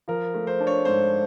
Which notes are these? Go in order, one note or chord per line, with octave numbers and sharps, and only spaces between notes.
F3 A#4
A3
C5
D4
C#5
G#2 C5